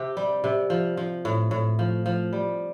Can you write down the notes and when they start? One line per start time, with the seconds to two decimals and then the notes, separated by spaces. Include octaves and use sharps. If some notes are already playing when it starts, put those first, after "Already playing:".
Already playing: C3 G4
0.17 G3
0.44 C3
0.70 F3
0.97 F3
1.25 A2
1.51 A2
1.79 F3
2.06 F3
2.33 G3